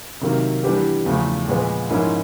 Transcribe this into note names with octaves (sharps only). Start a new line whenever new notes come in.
C3 D#3 F#3 A#3
E3 G3 B3 D4 G4
E2 C#3 F3 A3
A#2 F3 G#3 B3
G#2 F3 A#3 C#4 E4